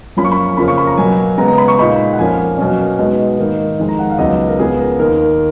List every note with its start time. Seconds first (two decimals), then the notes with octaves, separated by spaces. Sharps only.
0.17 F#2 F3 A#3 C#4 B5
0.24 C#6
0.32 B5
0.57 F2 C#3 F3 A#3 C#4 B5
0.68 C#6
0.77 B5
0.87 A#5
0.97 B2 F#3 A#3 G#5
1.38 C#3 G#3 B3 A#5
1.48 A#5
1.58 B5
1.68 C#6
1.78 A#2 G#3 D#4 B5
2.13 F#5
2.18 F2 F3 A#3 C#4 G#5
2.58 B2 F#3 A#3 C#4
2.98 B2 G#3 B3 D#4
3.39 G#2 D#3 A#3 D#4
3.79 F2 D#3 G#3
3.89 A#5
3.99 F#5
4.10 F5
4.18 C#2 C#3 F#3 B3 D#4 D#5
4.47 A#4
4.59 C#2 C#3 F3 B3 G#4
4.79 A#4
4.99 D#2 D#3 A#3 A#4